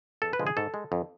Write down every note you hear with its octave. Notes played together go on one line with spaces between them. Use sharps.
E2 A4
B4
D3 F3 G#3
G#4
G#2 A4
G#3
F2